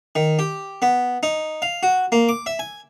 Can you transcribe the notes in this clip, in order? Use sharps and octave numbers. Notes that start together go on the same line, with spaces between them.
D#3
G4
B3
D#4
F5
F#4
A#3
D6
E5
G#5